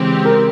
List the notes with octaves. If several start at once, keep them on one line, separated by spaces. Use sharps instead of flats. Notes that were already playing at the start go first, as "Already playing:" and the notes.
Already playing: C#3 E3 G#3 C4 G4
A#4